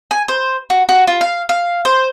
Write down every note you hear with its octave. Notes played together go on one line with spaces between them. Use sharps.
G#5
C5
F#4
F#4
F4
F5
F5
C5